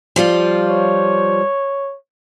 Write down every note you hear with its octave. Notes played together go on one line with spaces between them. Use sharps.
F3 G3 F4
C#5